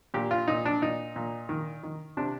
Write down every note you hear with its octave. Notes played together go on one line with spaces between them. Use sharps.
A#2 G4
F4
A#2 D#4
D4
A#2 D#4
A#2
D#3
D#3
C3 D4